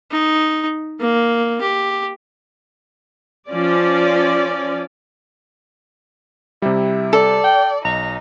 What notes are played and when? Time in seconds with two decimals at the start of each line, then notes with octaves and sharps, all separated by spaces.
0.11 D#4
1.00 A#3
1.61 G4
3.49 F3 C#4 D5
6.62 C3 G3 E4
7.13 A4 D5
7.44 G5
7.85 B1 D#4 A#5